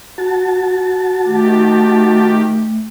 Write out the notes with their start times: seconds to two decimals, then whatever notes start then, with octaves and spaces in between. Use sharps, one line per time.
0.18 F#4 A5
1.25 D#3 A3 G4